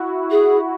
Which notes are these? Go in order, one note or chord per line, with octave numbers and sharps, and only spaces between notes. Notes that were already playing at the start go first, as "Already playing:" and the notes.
Already playing: E4 F#4
G#4